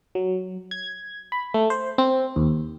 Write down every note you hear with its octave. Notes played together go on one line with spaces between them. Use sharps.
F#3
G#6
B5
A3
C5
C4
D#2